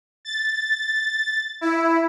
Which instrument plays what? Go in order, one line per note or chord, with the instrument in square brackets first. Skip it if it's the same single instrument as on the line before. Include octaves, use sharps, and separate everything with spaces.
[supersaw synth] A6
E4